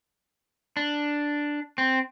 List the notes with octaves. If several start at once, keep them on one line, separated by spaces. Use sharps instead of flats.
D4
C4